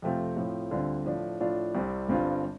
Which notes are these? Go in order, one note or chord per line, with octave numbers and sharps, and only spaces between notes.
F2 C3 A3 C4 F4
A2 F3 C4
D2 D3 G3 C4 F4
A2 F3 D4
A2 F3 D4 F4
C2 C3 G3 C4
G1 G2 G3 C4 F4